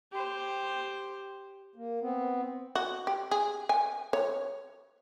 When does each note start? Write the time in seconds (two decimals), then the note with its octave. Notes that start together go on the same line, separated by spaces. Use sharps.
0.12 G4 C5
1.76 A#3
2.01 B3 C4
2.75 F#4
3.07 G4
3.31 G#4
3.69 G#5
4.13 C#5